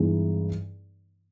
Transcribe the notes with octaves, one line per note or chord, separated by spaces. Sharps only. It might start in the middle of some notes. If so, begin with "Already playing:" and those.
Already playing: G2 E3 G#3 B3 D#4